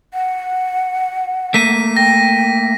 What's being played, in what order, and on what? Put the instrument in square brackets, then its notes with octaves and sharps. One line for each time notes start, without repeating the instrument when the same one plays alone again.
[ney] F#5
[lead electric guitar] A3 A#3 [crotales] B6 D#7
[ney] G5 [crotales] A#6